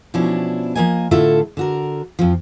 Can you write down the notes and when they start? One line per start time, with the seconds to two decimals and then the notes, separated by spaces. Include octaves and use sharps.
0.14 B2 F3 C#4 D4 E4
0.75 F3 G#3 A#3 D#5 G#5
1.11 A2 D3 E4 F4 A4 E5
1.57 D3 F#4 A#4
2.19 F2 F3